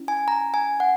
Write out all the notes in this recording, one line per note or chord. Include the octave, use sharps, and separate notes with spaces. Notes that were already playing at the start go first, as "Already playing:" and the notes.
Already playing: C#4 E4
G#5
A#5
G#5
F#5